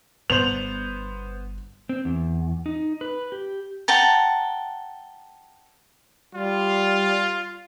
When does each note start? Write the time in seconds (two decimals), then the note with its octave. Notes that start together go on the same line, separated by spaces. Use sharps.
0.30 G1 B3 C5 F7 F#7
1.89 C4
2.05 E2
2.66 D#4
3.01 B4
3.32 G4
3.88 F#5 G5 A5 A#5
6.35 G3 F4